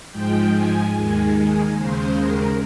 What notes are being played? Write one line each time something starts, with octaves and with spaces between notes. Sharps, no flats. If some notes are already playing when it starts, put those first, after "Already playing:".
G#2 F3 G#3 G5
G#5
D#2 D#3 G#3 G#5
D#2 C#3 G#3 C5
A#4